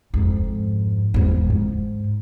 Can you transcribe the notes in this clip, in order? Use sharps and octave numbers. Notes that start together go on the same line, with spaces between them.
F2 G#2
E2 G#2
G#2